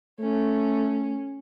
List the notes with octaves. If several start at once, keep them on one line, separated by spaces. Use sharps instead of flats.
A3 C#4